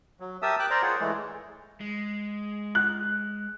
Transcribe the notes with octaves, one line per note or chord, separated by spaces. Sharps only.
F#3
G4 A#4 E5 A5 D#6 E6
G5 D6 F#6
A#4 C5 D5 A#5
F4 G#4 C#5 F#5
E3 G#3 A3
G#3
F#6